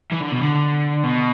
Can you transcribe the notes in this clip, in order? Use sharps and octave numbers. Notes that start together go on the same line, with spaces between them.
E3
D3
B2
D3
B2